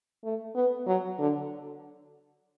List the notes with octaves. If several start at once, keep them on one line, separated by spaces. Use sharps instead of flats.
A3
B3
F#3
D3